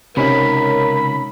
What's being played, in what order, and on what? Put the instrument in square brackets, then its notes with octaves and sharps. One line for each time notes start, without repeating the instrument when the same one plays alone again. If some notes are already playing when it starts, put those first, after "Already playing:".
[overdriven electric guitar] C#2 [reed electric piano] C3 C#4 D#4 [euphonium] A#4 [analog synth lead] B5